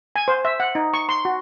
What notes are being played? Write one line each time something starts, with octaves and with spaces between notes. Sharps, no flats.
G#5
C5
E5
F#5
D#4
C#6
C6
F#4